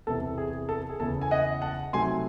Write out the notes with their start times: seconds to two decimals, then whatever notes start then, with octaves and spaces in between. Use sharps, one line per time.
0.07 E2 C3 E3 A4
0.38 G#4
0.69 A4
0.90 G#4
1.00 E2 C#3 E3 A4
1.22 G#5
1.31 D#5 F#5
1.62 F#5 A5
1.93 C3 F#3 A3 D#4 G#5 C6